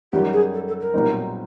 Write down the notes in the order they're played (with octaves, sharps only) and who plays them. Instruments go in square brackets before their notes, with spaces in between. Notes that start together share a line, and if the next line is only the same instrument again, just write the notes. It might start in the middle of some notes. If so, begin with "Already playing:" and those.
[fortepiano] F#2 D#3 G3 [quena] G4
[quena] G#4
A4
A4
A#4
[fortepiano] B1 A#2 G3 C4 D#4